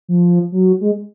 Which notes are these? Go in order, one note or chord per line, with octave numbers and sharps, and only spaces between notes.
F3
F#3
G#3